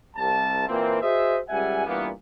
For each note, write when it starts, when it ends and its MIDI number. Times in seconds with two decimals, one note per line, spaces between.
0.16 0.63 36
0.16 0.63 81
0.67 1.00 46
0.67 1.00 52
0.67 1.00 58
0.67 1.00 60
1.01 1.38 66
1.01 1.38 68
1.01 1.38 72
1.01 1.38 75
1.01 1.38 76
1.49 1.85 37
1.49 1.85 55
1.49 1.85 76
1.49 1.85 78
1.49 1.85 80
1.85 2.08 43
1.85 2.08 46
1.85 2.08 52
1.85 2.08 58
1.85 2.08 59